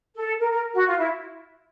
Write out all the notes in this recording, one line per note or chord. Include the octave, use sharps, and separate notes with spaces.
A4
A#4
A#4
F#4
F4
E4